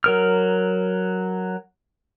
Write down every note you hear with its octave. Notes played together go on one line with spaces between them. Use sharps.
F#3 A#4 F6